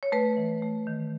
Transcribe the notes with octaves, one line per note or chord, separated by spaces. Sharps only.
C#5
A3 B4
E3
A3
D#3